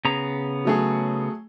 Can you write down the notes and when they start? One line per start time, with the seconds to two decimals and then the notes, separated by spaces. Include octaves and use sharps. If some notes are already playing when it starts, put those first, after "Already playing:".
0.05 C#3 B3 A#5
0.65 F#3 A3 G#4